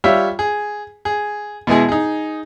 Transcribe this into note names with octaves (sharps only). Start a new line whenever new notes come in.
G3 F4 C#5 E5
G#4
G#4
B2 E3 G#3 G#4
D#4 G#4